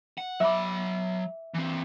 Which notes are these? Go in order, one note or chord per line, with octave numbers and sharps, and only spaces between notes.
F#5
F#3 E5 B5 D6
E3 C4